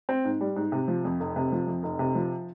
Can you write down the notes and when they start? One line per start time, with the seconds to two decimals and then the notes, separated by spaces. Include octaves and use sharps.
0.09 C4
0.25 G#2
0.41 G3
0.56 G#2
0.72 C3
0.88 F3
1.05 F2
1.20 F1
1.36 C3
1.52 F3
1.67 F2
1.83 F1
1.99 C3
2.15 F3